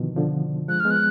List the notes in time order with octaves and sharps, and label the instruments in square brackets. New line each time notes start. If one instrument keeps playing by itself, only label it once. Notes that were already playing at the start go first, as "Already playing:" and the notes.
Already playing: [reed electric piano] B2 D3 D#3 F3
D3 F3
[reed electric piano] F3 G#3 [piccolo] F#6
[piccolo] F6
[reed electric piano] G#3 B3
[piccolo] F#6